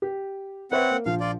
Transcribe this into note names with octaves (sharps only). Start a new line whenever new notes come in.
G4
C4 B4 C#5 E5 F#5
A#3
A#1 F3 F5
F4 D5